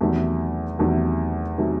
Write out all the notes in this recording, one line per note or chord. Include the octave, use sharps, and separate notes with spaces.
E2 C3 D#3 F#3 A3
E2 C3 D#3 F#3 A3
C3 D#3 F#3 A3